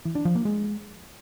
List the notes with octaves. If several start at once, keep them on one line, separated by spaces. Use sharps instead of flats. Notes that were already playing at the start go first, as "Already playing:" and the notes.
E3
D4
F3
A#3
G#3